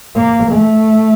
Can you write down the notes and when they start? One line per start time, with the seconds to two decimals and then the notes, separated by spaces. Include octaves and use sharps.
0.16 A#3
0.52 A3